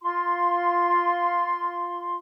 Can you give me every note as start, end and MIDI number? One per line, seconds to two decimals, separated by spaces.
0.01 2.15 65
0.01 2.15 84